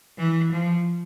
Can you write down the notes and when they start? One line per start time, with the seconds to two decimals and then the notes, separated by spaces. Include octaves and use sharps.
0.18 E3
0.52 F3